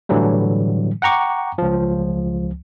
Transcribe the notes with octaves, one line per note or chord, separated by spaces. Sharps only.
A2 D3 E3 F#3 G3
F#5 G5 A#5 C#6 D6
C#2 F3